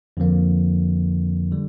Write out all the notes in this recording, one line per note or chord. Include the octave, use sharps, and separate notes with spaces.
F2 D3 F3 A#3
D3 G3